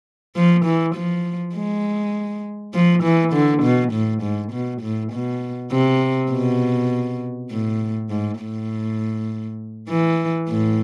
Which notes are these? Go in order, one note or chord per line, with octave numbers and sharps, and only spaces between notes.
F3
E3
F3
G#3
F3
E3
D3
B2
A2
G#2
B2
A2
B2
C3
B2
A2
G#2
A2
E3
A2